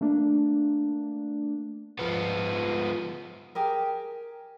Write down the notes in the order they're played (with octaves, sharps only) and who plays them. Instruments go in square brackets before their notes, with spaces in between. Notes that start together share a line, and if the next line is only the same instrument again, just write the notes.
[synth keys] A3 A#3 D4
[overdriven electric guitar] F3 B3
[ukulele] G4 G#4 A#4